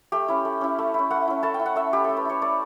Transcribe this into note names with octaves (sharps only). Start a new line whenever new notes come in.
A3 G4
C#4 E4
A3
C#4 E4
A3
C#4 E4
A3 F#5
C#4 E4
A3 A5
G5
E4
F#5
A3 E5
E4 G4
A3 A4
B4
E4 C#5
A3 D5